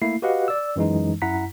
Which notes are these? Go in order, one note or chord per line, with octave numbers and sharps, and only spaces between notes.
A3 A#3 E4 C7
F#4 G4 B4 D#5 F5 F#5
D5 E6
F#2 E3 G#3 D#4
F#2 E4 F#5 A#5 B6